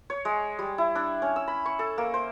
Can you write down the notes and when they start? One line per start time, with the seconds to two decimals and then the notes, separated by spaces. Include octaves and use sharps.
0.10 C#5
0.25 G#3
0.59 G3
0.78 E4
0.95 D4
1.22 C#4
1.36 E6
1.48 B5
1.66 C#6
1.79 A4
1.98 A#3
2.14 C5